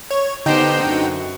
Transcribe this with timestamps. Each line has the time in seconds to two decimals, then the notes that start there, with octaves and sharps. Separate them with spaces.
0.11 C#5
0.46 D3 B3 D#4 G4 C5 G5
0.84 F#2 F#4